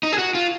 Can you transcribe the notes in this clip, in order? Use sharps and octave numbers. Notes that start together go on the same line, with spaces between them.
D#4
G#4
F#4
F4